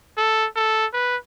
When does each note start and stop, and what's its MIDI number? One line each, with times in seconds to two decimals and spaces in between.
0.17 0.47 69
0.56 0.86 69
0.93 1.17 71